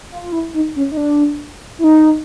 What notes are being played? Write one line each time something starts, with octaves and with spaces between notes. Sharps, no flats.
F4
F4
E4
D#4
C#4
D#4
D4
E4
D#4